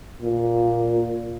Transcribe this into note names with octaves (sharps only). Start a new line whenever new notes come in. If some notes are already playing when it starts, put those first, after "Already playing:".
A#2